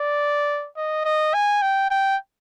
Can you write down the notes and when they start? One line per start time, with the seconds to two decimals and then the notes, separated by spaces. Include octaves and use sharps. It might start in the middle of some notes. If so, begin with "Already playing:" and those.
Already playing: D5
0.77 D#5
1.05 D#5
1.34 G#5
1.62 G5
1.91 G5